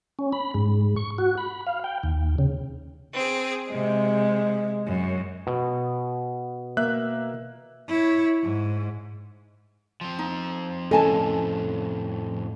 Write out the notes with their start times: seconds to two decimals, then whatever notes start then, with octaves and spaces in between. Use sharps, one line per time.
0.19 C#4
0.33 B5
0.54 G#2
0.96 C#6
1.18 F#4
1.38 B5
1.67 F5
1.84 G5
2.03 D#2
2.38 C#3
3.14 C4 G#4
3.72 C3 G#3
4.84 F#2
5.47 B2
6.77 A#3 E5 F#6
7.88 E4 C#5
8.43 G#2
10.01 F3 C4
10.19 D#4
10.91 F2 A2 C#4 A4 D#5 G#5 A5